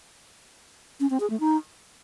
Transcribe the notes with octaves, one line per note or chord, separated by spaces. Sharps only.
C#4
C4
G#4
A3
D#4